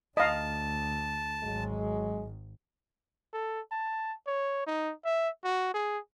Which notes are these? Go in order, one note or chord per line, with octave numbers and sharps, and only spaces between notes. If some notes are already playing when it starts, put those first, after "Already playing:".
D2 D#5 F5 A5
G#1 F#3 G#3
A4
A5
C#5
D#4
E5
F#4
G#4